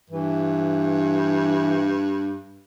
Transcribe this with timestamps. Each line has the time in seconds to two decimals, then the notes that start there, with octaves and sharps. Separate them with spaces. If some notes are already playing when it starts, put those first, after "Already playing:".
0.10 G2 E3